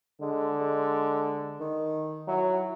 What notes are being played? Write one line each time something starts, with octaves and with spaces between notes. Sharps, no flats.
D3 G#3
G#3
D#3
F#3 E4